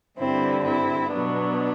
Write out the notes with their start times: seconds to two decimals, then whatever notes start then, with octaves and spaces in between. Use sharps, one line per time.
0.18 G2 D3 G3 C4 E4
0.65 C4 E4
1.11 B2 F#3 B3 D4